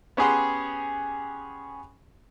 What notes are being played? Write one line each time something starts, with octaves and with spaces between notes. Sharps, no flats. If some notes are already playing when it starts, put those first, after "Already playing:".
B3 C#4 G4 G#4 F#5 C6